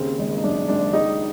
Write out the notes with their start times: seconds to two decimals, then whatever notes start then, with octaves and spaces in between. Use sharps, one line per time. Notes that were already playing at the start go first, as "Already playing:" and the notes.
Already playing: D#2 C#3 C4
0.19 G#1
0.38 D#4
0.44 F#2 D4
0.68 G#1 D4
0.93 C#2 D#4